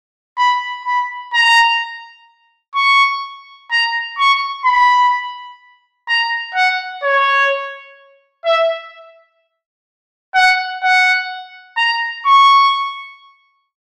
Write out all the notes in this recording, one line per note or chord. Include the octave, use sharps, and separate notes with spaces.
B5
B5
A#5
C#6
A#5
C#6
B5
A#5
F#5
C#5
E5
F#5
F#5
A#5
C#6